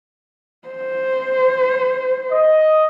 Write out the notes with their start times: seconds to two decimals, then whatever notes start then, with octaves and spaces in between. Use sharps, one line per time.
0.68 C5
2.31 D#5